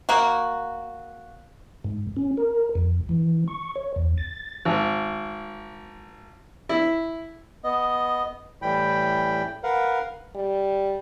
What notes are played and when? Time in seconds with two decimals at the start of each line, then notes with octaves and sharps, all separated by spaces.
0.09 A#3 F#4
1.84 G#2
2.17 C#4
2.37 A#4
2.75 F2
3.09 E3
3.48 C#6
3.76 C#5
3.96 E2
4.18 A6
4.65 G#1
6.69 E4
7.64 B3 D#5
8.62 A2 E3 G3 G5 B5
9.63 A#4 B4 F5 F#5
10.35 G3